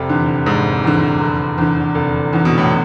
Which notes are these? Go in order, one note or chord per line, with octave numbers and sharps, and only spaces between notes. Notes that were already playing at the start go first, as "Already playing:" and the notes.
Already playing: F1 C3
E2 D3
F1 G#2
E2 D3
F1
E2 D3
F1
E2 D3
B2
A2